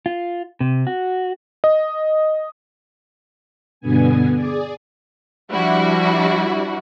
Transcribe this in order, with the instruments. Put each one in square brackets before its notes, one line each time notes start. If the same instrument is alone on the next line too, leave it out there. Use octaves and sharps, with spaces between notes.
[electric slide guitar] F4
C3
F#4
[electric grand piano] D#5
[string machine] G2 B2 D3 B3 G#5
G#4 D5
[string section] F3 G3 D4 E4 F#4